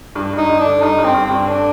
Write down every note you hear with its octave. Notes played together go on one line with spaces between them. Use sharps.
G2
G2 D#4
G2
D4
D3
G2 D#4
G2
C4
G2
C4
G2
D3 D4